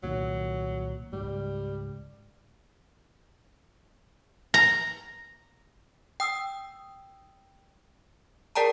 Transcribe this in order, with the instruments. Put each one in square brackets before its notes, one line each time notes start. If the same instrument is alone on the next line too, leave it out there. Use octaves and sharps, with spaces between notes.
[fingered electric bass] C2 A#2 D#3 [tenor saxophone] F#3
[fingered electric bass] C#2 G#2 [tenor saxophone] G3
[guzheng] A#5
[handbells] G5 D#6 E6
G#4 A#4 D5 G5 A5 A#5